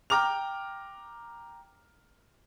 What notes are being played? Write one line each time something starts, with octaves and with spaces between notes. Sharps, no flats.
G5 A#5 D6 F6 F7